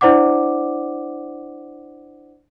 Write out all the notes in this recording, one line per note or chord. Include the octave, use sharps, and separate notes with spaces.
D4 E4 C5 D5 F#5 D6